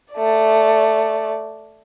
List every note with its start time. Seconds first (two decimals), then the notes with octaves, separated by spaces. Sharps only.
0.14 A3 D5